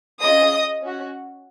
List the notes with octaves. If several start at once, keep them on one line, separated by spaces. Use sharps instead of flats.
C#4 F4 G#4 D#5 D#6
C#4 F#4